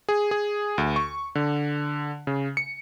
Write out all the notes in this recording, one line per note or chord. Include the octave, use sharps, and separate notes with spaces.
G#4
G#4
D2
C#6
D3
C#3
C#7